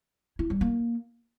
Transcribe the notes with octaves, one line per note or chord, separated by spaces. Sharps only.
E4
G3
A#3